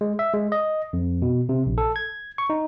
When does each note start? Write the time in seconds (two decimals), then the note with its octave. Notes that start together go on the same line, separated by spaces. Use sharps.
0.01 G#3
0.19 E5
0.34 G#3
0.52 D#5
0.93 F2
1.22 B2
1.49 C3
1.66 A#1
1.78 A4
1.96 G#6
2.38 C#6
2.50 D#4